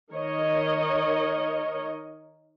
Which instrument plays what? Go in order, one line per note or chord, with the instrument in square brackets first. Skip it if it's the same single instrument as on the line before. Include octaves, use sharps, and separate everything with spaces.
[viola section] D#3 A#4 C#5 D#5